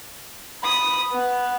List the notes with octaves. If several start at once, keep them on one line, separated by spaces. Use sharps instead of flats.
B5 D#6
B3